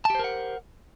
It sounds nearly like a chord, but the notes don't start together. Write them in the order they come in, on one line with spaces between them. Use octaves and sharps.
A5 G4 C5 A#4 F#5